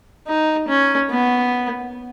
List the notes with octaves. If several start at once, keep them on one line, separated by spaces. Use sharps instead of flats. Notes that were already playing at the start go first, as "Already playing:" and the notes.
D#4
C#4
B3